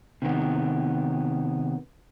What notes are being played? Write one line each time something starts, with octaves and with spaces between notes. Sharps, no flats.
C3 D#3 B3